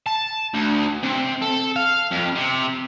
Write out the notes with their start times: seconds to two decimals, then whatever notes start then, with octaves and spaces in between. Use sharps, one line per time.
0.06 A5
0.54 D2
1.03 C3
1.41 A4
1.76 F5
2.11 F2
2.36 C3